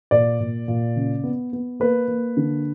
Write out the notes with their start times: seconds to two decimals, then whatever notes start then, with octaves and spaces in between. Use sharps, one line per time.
0.11 A#2 D5
0.40 A#2
0.68 A#2
0.96 C#3
1.24 B3
1.53 B3
1.80 A#3 B4
2.08 A#3
2.37 D3